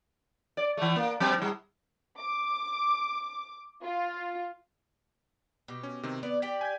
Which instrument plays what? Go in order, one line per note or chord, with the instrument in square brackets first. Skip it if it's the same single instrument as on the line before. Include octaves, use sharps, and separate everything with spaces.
[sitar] D5
E3 A3
A#3
F#3 C4
A2 G3
[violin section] D6
F4
[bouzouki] B2 G4
[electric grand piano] C#4
C3 D#3 C4
[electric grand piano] B3 [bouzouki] D5
[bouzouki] G4 D5 G5 [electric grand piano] B6
[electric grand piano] G#5 G6 G#6